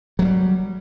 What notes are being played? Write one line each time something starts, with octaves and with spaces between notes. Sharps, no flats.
F#3 G3 A3